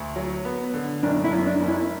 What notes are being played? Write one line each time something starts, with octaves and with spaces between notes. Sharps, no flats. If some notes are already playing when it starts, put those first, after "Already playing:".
Already playing: D2
F#3
B3
D3
F#1 D4
E4
F#2
D4
F#1
E4